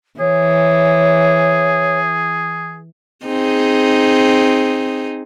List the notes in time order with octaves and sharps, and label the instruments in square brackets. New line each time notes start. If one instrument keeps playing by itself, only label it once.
[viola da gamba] E3 [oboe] G#4 [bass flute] C#5
[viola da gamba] C4 D#4 G#4